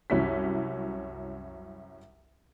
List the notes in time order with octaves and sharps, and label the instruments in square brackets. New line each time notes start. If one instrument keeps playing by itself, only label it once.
[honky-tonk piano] C2 F#2 C#4 E4 B6